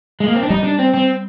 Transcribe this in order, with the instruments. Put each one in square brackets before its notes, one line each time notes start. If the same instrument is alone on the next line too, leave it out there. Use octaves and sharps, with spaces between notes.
[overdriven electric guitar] G#3
A#3
C4
D4
[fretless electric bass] G3 [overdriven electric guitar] D#4
[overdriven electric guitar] D4
C4
C4